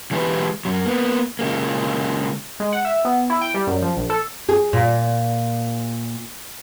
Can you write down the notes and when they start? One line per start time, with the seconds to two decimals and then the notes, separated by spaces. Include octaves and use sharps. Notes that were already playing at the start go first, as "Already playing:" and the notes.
0.11 E3 G#3 D4 E4 G4 B4
0.65 F#2 F#3
0.85 A#3 B3
1.39 C#3 G#3 A#3
2.60 G#3
2.72 F#5
2.85 E5
3.05 B3
3.30 E4
3.41 G5
3.54 G3
3.67 F#2
3.82 F3
3.97 A#1
4.10 A4
4.49 G#4
4.73 A#2